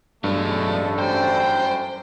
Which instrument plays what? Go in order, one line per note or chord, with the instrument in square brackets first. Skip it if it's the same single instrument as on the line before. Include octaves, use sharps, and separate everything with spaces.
[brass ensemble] A1 D4 A4 [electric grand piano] G2 [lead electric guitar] F#3 B3 [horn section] G#3 A3
[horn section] F#2 G3 G5 [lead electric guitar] C5